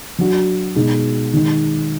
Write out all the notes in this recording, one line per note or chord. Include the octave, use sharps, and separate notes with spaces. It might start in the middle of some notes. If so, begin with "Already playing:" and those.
F#3 D4 F#4
B2 G#3 D#4 G#4
D#3 G#3 D#4